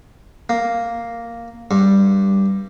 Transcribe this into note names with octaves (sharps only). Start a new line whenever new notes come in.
A#3
G2